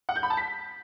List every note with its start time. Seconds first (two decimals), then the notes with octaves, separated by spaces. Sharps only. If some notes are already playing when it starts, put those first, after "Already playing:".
0.09 F#5
0.16 G6
0.23 B5
0.30 A5
0.37 B6